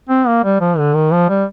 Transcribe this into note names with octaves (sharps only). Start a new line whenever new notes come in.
C4
A#3
G3
F3
D3
D#3
F3
G3